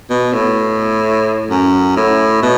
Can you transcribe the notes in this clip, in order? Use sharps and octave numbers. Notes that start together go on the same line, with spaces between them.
B2
A2
F#2
A2
B2